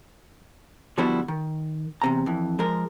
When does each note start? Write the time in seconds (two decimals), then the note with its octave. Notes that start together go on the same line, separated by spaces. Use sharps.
0.98 D3 F3 G3 B3 E4 F#4
1.28 D#3
2.02 E2 C3 A#5
2.26 F2 E3
2.59 F3 G#3 A#4